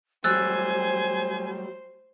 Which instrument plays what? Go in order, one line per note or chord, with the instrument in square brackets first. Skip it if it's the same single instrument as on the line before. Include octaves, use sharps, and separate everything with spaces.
[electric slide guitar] F#3 G3 A3 [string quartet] C5 [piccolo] G#5 [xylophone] E6 F#6 A6